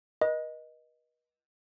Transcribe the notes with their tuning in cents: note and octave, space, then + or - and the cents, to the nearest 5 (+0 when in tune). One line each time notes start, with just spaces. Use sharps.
B4 -45 D#5 +0